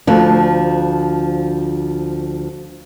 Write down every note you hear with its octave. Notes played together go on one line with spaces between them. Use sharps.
D2 F3